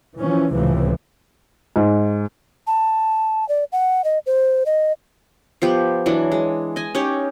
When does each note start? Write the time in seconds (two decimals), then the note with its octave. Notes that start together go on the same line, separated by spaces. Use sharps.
0.17 E3 F3 C#4
0.53 C#2 A2 C3 E3 F3
1.76 G#2
2.67 A5
3.49 D5
3.72 F#5
4.04 D#5
4.26 C5
4.66 D#5
5.62 F3 B3 G4
6.06 E3 F#3 D4
6.32 G#3
6.76 D#5 G#5
6.95 C#4 D#4 G4 C#5